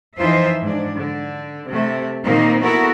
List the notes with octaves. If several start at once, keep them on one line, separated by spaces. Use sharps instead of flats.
F2 E3 D#4 F4 C5 E5
G#2 D4
D3
C3 A3
A#2 D#3 A#3 C4 D#4
B3 E4 F#4 A4 A#4